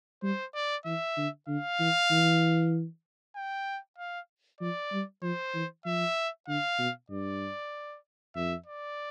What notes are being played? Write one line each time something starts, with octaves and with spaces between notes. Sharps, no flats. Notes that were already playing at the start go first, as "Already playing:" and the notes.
G3 C5
D5
E3 E5
D3
D3 F5
E3
E3
G5
F5
F3 D5
G3
F3 C5
E3
F3 E5
D3 F5
B2
G2 D5
F2 E5
D5